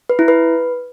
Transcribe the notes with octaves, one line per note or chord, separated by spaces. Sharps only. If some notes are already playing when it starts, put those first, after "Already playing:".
B4
E4
B4